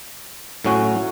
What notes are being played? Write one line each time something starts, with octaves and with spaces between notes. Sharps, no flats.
A2 F#3 C#4 F#4